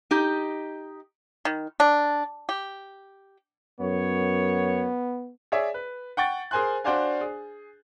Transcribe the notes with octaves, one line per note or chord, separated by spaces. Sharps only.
D#4 G4 D#5
D#3
D4
G4
F#2 B3 C#5
G#4 C#5 D5 E5
B4
F#5 G5 C#6 A6
G#4 A#4 C5 G#5 C6 F#6
D4 F#4 C5 D5 F5 G#5
G#4